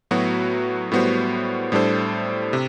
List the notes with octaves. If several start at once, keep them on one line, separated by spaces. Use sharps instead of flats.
A2 F#3 B3 F#4 B4
A2 G3 B3 F#4 C5
A2 G3 D4 A4 C5
C3